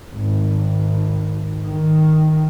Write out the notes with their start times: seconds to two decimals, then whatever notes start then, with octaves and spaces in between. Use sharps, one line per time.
0.12 G#1
1.65 D#3